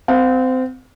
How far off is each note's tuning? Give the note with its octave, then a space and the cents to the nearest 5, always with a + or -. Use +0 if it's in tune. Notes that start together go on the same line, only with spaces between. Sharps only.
C4 -25 F5 +35